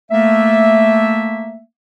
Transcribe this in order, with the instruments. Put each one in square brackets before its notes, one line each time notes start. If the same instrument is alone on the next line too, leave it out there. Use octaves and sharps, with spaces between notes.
[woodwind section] A3 A#3 E5